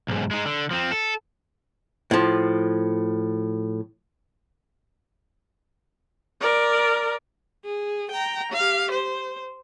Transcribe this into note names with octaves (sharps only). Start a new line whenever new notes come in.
B1 G#2
G#3 D#4
D3
F3 C4
A4
A2 F3
A#4 D5
G#4
G5 A#5
G4 F5
C5